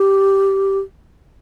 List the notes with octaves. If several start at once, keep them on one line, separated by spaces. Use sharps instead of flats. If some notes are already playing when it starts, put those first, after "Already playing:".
Already playing: G4